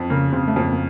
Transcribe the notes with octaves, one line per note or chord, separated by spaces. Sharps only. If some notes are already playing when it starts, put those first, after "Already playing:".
Already playing: F2
C#3 A#3
C#3 C4
A3
F2 A#3
A#3